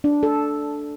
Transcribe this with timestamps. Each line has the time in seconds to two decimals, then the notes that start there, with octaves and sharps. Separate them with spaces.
0.04 D4
0.23 A4